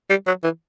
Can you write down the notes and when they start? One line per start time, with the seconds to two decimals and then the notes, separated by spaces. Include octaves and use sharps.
0.10 G3
0.27 F#3
0.43 E3